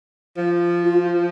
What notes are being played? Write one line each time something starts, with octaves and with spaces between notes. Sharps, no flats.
F3
F4